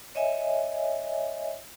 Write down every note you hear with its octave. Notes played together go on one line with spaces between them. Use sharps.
C#5 D#5 E5 G#5